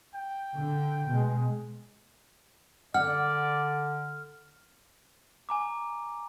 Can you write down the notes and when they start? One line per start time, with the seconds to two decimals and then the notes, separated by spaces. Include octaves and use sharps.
0.15 G5
0.56 D3
1.08 B2 G#3
2.94 D3 D5 F#5 F6
5.49 G#5 A#5 D6